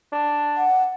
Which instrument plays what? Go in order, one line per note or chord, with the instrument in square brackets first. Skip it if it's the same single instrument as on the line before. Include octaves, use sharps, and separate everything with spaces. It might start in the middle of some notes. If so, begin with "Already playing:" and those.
[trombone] D4
[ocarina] F#5